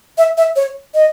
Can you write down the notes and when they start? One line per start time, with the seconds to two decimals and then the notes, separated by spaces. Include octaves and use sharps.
0.18 E5
0.37 E5
0.56 C#5
0.94 D#5